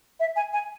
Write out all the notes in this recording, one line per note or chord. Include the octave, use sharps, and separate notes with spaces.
E5
G#5
G#5